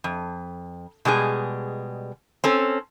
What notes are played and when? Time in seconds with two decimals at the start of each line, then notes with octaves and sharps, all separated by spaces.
0.04 F2
1.05 B2 G3 G#3 G#4
2.44 C4 C#4 A4